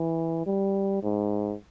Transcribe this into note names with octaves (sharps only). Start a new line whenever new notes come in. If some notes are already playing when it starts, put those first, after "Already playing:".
Already playing: E3
G3
G#2